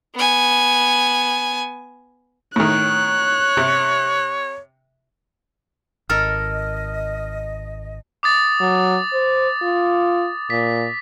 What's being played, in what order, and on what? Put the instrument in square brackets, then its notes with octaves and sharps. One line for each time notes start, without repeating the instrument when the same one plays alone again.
[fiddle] B3 G#5
[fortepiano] A2 D#3 [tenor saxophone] C#5 [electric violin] F#6
[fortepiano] C3
[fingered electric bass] G#1 [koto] A4 A#4 [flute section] D#5 [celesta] F6
[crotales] D6 D#6 A6
[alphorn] F#3
C5
F4
[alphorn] A#2 [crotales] B6